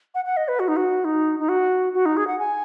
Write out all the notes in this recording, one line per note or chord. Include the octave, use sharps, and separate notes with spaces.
F#5
F#5
D#5
B4
F#4
D#4
F#4
D#4
D#4
F#4
F#4
D#4
G#4
F#5
G#5